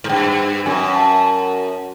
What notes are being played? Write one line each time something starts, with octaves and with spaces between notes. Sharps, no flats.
G#2
G2 G5
F#2 G#5
A5